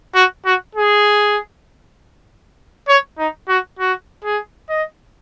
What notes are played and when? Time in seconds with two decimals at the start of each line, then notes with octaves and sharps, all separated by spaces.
0.15 F#4
0.45 F#4
0.75 G#4
2.88 C#5
3.18 D#4
3.48 F#4
3.79 F#4
4.24 G#4
4.69 D#5